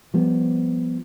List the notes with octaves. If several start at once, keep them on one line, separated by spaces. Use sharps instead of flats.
F3 G3 B3